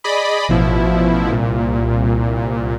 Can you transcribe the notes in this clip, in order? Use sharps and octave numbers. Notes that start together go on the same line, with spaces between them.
G#4 D5 D#5 B5
A1 B2 F3 E4
C2 A#2